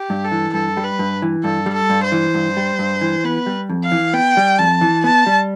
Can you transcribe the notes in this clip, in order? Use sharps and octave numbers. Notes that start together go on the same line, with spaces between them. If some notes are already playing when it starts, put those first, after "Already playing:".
Already playing: G4
G2
A4
E3
G2 A4
G3
B4
G2
E3
G2 A4
G3
A4
G2
C5
E3
G2
G3
G2
E3
B3 B4
G3
F2
F5
E3
B3 G5
G3
F2 A5
E3
B3 A5
G3